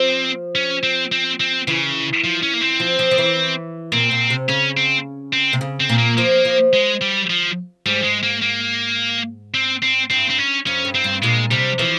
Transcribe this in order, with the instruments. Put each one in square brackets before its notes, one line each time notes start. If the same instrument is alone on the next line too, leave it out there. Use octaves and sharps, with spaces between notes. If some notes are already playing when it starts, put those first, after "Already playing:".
Already playing: [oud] F3 [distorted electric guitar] C4
[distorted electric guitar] C#4
C4
C4
C4
[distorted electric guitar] C#3 [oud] E3
[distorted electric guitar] F3
C#4
A#3
C4
[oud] F3
F3
F3
E3
[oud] A#2 [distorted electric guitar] C4
[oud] A#2
C3
[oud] C#3 [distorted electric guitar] C#4
[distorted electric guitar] C4
C4
[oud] C3
C#3
[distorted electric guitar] C4
[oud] A#2
[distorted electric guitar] A#3
[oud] F3 [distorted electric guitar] A#3
[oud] F3
[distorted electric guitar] G#3
G3
F3
[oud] G#2 [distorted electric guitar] G3
[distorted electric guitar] G#3
A#3
A#3
C4
C4
[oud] G2 [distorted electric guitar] C4
[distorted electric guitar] C4
C#4
[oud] F2 [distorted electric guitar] C#4
[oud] G2
[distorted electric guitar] C4
[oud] G2
[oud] A#2 [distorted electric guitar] G#3
[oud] C3 [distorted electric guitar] G3
[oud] E3 [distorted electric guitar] F3